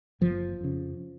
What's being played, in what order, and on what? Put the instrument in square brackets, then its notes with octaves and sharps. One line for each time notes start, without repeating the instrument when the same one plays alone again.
[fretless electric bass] F#1 F3
F2 C#3